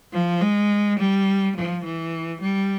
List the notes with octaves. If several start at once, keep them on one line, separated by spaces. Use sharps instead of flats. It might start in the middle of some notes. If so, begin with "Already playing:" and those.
F3
G#3
G3
F3
E3
G3